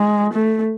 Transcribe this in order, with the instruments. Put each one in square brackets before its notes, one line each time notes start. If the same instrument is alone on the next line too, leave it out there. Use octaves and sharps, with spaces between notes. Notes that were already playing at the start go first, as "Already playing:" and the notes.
Already playing: [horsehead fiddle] G#3
A3